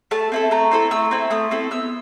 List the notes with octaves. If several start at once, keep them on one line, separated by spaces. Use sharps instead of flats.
A3 A5
C4 E4 A4
A3 A#5
C4 E4 A4
A3 E6
C4 E4 A4
A3 D#6
C4 E4 A4
B3 E6